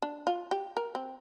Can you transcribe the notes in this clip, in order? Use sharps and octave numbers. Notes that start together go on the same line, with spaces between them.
D4
F4
G4
A#4
C4